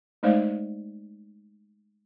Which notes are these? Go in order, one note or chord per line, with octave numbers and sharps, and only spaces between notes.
G#3 A3 D#4 C5 D5 F5